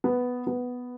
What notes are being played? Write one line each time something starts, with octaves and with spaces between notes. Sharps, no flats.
B3
B3